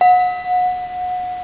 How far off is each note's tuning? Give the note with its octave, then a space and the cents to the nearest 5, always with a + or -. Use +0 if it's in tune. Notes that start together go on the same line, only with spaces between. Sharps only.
F#5 -30